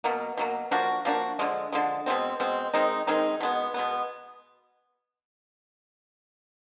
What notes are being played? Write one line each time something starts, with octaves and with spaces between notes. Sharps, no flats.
B2 F#3 A#3
B2 F#3 A#3
F3 A#3 D4 F#4
F3 A#3 D4 F#4
D3 F3 G#3
D3 F3 G#3
B2 G#3 C4
B2 G#3 C4
D#3 G#3 C4 D#4
D#3 G#3 C4 D#4
B2 G#3 B3
B2 G#3 B3